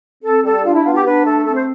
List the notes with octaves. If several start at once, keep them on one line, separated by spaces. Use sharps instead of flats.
C4 A4
G3 A4
D4 F4
E4
B3 F4
G4
D4 B4
A3 A4
C4 A4
C5